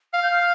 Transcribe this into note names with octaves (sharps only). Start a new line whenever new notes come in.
F5 F6
G6
F6